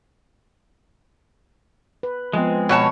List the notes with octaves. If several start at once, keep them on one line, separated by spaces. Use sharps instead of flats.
B4
F3 G#3 B3 C4
B2 C#5 A5